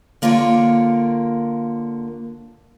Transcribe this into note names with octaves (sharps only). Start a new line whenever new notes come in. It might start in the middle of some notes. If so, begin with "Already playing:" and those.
D3 A#3 F4 A#4 C#5